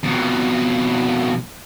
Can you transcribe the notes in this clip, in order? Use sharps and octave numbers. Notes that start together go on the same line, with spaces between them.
F2 B2